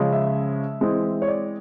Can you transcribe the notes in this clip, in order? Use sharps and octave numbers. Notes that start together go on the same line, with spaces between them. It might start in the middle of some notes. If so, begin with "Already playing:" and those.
Already playing: C#3 F3 G#3 C#4
E5
E3 G#3 C4
C#5
D5